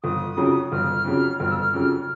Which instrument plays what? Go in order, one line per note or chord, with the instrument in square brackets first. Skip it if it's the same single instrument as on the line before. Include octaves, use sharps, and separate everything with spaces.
[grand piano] G1 [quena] D#6
[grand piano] F2 C#3 F#3
[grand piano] G1 [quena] F6
[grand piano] F2 C#3 F#3
[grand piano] G1 [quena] F6
[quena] E6
F6
[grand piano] F2 C#3 F#3 [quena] F6